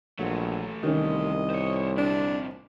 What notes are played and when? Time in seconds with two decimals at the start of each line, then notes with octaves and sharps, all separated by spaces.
0.19 A#1 E3 F#3 A3
0.83 C2 D#3 C#4 D#5
1.50 C5 C#5
1.98 A#2 C4 D4